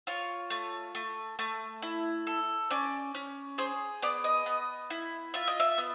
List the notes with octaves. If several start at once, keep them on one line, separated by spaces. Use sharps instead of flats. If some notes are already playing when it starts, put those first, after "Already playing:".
F4 C#5
A3
A3
A3
E4
A4
C#4 D5
C#4
G#4 C5
B3 D5
D#5
B3
E4
F4 E5
D#5
E5
B3